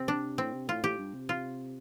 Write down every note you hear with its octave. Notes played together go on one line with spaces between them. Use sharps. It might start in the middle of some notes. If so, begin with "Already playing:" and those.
Already playing: C3 C4
D4
A2 C4
C3
A2 F4
A2 G4
G2
C3
F4